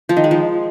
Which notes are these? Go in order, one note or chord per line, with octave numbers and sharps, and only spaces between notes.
F3
D#3
G#3
F3